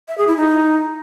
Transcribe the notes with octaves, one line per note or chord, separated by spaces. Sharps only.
E5
G#4
E4
D#4